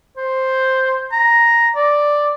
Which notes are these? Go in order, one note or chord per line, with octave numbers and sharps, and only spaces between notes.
C5
A#5
D5